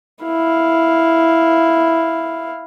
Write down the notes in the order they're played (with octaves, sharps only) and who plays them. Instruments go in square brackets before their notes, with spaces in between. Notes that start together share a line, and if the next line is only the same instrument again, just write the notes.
[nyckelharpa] E4 F5